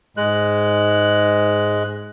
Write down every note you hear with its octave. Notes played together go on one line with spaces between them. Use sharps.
G#2 G#3 F#6